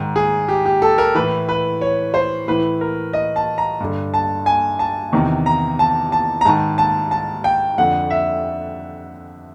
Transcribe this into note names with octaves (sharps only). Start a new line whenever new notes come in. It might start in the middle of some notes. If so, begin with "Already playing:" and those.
Already playing: G#2 D#3
G#4
G4
G4
A4
A#4
A2 E3 B4
B4
C#5
C5
A2 E3 B4
A#4
D#5
A5
A#5
G2 D3
A5
G#5
A5
E2 C3 D#3
A#5
A5
A5
A#5
G#2 D#3 A5
A5
A5
G5
F2 D3 F#5
E5